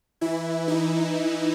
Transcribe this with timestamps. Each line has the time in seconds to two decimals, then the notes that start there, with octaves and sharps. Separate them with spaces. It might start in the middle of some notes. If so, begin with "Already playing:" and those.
0.21 E3 E4
0.68 D#4